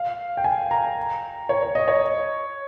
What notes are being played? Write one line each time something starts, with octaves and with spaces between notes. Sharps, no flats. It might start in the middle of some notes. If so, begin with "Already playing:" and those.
Already playing: F5
G5
G#5
A#5
C#5
C#5
D#5
C#5